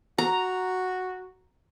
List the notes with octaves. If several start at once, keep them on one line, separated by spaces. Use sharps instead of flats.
F#4 A#5